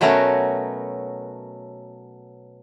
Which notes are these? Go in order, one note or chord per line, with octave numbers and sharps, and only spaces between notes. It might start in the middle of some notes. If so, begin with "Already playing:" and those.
B2 F#3 A3 B3 C#4 A#4